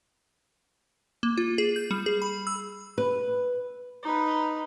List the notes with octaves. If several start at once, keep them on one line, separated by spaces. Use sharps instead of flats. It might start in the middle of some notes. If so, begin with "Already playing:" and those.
A#3
F4
G#4
G6
G3
G#4
B5
E6
B4
D#4 B4